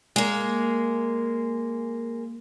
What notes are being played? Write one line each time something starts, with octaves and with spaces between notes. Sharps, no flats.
G#3 A#3